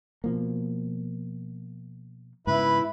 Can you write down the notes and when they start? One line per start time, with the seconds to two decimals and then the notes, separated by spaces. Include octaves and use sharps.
0.24 B2 F3 A#3
2.47 G#2 C#3 B3 E4 B4